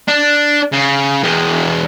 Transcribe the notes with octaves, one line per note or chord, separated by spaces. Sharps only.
D4
C#3
E2 G#3